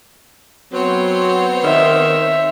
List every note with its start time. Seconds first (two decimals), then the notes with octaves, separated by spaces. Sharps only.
0.73 F#3 B3 C4 C5 C#5
1.64 D#3 E5